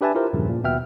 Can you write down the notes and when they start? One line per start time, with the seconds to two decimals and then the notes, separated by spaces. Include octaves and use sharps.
0.01 D4 G4 B4 E5 G#5 A5
0.15 E4 F4 G4 A#4 C5
0.33 E2 G2 A#2 C#3 F3
0.49 A#2
0.63 D#2 B2 B3 E5 G5 F6